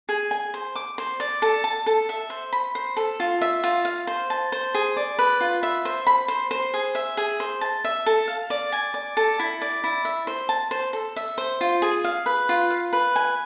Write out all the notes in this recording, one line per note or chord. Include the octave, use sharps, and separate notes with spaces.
G#4
G#5
C5
D6
C5
D5
A4
A5
A4
E5
C5
B5
C5
A4
F4
E5
F4
F5
C5
A5
C5
G#4
D5
B4
F4
E5
C5
B5
C5
C5
G#4
E5
G#4
C5
A5
E5
A4
F5
D5
G#5
D5
A4
E4
D5
E4
E5
C5
A5
C5
A4
E5
C5
F4
G#4
F5
B4
F4
F5
B4
G#5